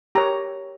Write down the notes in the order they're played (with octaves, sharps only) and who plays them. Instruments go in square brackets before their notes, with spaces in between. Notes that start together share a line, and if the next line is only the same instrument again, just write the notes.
[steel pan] G4 A#4 C#5 A#5